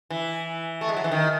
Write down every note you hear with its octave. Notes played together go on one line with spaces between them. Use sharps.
E3
A3
G#3
F#3
E3
D#3